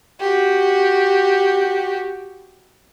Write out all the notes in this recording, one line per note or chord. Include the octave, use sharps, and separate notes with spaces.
F#4 G4